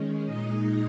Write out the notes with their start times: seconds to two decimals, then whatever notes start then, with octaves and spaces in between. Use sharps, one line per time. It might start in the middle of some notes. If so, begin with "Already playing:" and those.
Already playing: D#3 G#3 C#4
0.25 A#2 G#3 D#4 D#5